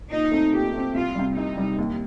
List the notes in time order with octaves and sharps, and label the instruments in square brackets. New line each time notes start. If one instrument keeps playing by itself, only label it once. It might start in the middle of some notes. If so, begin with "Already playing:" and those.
[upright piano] A#2 [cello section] D#4
[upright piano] A3 C4
[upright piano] A#2 [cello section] G4
[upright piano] A3 C4
[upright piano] C2 [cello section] F4
[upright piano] C3 G3
[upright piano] C2 [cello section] D#4
[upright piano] C3 G3
D#2